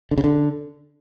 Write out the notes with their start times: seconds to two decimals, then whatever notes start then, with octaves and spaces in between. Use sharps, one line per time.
0.11 D3
0.18 C#3
0.24 D3